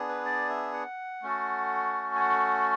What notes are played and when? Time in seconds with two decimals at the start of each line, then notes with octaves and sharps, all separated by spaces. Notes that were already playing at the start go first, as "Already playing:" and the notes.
Already playing: B3 D4 G#4
0.09 B4
0.25 D5
0.49 E5
0.74 F#5
1.23 A3 C#4 F#4 A4
2.16 G#5
2.20 F#5